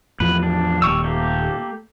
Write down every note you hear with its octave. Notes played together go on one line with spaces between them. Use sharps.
E2 A2 F3 B4
D4
D#1 G3 C#6 E6
A3 A#3 G4